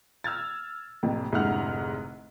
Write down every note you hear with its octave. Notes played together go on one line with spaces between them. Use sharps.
E6 F6 G#6 A6
F1 F2 A2
F1 G#2 D3 E4 F#5 F6